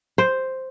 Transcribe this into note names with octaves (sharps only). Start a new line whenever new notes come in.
C5